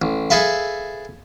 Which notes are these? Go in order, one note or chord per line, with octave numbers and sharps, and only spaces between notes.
A1
G#4 A4 B4 E5 F5